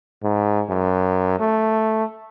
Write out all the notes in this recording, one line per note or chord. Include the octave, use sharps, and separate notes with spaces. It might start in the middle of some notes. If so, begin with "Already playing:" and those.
G#2
F#2
A3